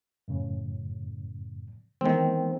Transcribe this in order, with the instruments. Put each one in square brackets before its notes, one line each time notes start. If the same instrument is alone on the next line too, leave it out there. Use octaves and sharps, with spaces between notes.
[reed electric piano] F#2 A2 C#3
[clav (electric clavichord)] D#3 C4 [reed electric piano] E3 G#3 B3